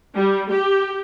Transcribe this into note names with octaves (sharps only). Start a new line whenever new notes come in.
G3
G4